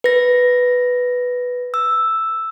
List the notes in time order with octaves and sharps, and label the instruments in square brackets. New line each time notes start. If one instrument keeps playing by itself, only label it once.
[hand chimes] B4 A#6
E6